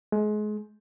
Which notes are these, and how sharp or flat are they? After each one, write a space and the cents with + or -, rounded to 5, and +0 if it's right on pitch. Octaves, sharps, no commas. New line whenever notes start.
G#3 +30